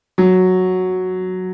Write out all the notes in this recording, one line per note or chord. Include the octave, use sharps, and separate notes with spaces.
F#3